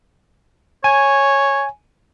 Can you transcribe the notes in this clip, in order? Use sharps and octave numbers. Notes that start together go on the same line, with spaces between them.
C#5 G#5